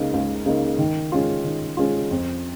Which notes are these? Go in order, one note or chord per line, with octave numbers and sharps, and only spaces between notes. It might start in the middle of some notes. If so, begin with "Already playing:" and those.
Already playing: C#2 C#3 A#3 D#4
C#2
C#3 A#3 D#4
D#3
G#3 C#4 F4
D#3
G#3 C#4 F4
F2